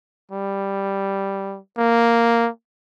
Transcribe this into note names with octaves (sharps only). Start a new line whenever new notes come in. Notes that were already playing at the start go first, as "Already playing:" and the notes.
G3
A#3